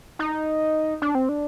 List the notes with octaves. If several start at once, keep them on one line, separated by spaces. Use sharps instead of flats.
D#4
D4
C4
D4